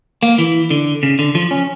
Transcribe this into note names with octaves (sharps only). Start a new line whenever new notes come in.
A#3
E3
D3
C#3
D3
F3
C#4